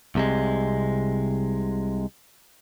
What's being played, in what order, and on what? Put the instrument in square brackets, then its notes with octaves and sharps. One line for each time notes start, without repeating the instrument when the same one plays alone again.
[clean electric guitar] C2 C3 G#3